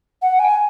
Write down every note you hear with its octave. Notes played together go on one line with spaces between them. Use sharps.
F#5
G#5